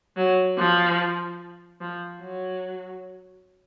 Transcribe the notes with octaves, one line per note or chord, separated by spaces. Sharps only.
F#3
F3
F3
F#3